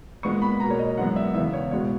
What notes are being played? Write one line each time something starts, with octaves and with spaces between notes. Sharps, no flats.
A#2 G#3 B3 C#6
B5
B2 A#3 A#5
C#5
D#5
F#2 E3 G#3 B3 F#5
E5
E2 C#3 E3 B3 E5
C#5
B2 G#3 B3 C#5